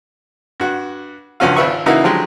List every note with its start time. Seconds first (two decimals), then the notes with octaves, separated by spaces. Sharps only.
0.60 G2 F#4
1.40 C#2 G2 F3 C#4 F#4 F5
1.56 G#1 C4 F4 B4 E5 C#6
1.86 C#3 E3 A#3 D#4 E4 F#4
2.03 D3 F3 F#3 G#3 G4